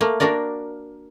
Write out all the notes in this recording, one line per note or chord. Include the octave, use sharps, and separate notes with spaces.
A3 A#3
A#3 D4 F#4 A#4 D5